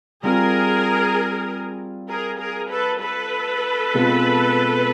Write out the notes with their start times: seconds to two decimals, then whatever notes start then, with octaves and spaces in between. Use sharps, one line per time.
0.23 G3 C4 F4 G#4 A#4
2.09 G#4 A#4
2.40 G#4 A#4
2.70 A4 B4
3.01 A4 B4
3.94 B2 G#3 C4 F4